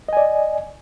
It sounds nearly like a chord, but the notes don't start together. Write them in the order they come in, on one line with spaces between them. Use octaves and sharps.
D#5 G#5 D5